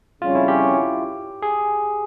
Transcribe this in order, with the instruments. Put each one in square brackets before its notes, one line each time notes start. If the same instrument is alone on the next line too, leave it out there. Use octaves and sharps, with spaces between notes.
[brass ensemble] F2 C#3 G3 C#4 [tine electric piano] F4
[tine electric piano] E4
G4
G#4